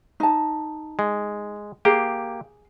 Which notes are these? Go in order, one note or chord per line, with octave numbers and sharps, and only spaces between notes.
D#4 A5
G#3
A#3 G4 G#4